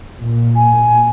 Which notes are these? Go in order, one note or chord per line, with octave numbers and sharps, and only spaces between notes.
A#2
G#5